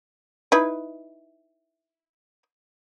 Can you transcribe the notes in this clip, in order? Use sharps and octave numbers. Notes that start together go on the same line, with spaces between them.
D#4 E4 B4